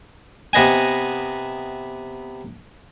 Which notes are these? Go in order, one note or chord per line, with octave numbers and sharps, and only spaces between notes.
C3 B3 D#5 G#5